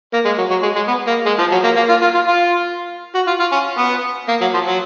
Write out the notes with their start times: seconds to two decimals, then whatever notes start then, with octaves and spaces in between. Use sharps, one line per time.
0.13 A#3
0.25 G#3
0.38 F#3
0.50 F#3
0.62 G#3
0.76 G#3
0.87 B3
1.07 A#3
1.26 G#3
1.39 F3
1.52 F#3
1.64 A#3
1.76 A#3
1.89 F4
2.01 F4
2.14 F4
2.26 F4
3.15 F#4
3.27 F4
3.40 F4
3.52 C#4
3.78 B3
4.28 A#3
4.41 F#3
4.54 F3
4.66 F#3